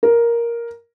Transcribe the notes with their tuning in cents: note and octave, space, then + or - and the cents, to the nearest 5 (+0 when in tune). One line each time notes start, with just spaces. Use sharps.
A#4 +5